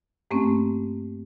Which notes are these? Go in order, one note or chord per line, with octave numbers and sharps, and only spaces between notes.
G2 A3 A#3 C4 C#4